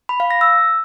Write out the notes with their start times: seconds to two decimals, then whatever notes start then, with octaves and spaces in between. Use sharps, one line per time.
0.09 B5
0.20 F5
0.31 A#6
0.41 E6